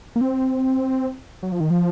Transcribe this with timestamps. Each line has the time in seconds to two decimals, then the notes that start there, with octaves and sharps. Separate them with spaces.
0.16 A#3
0.21 C4
1.43 F#3
1.52 F3
1.60 D#3
1.70 F3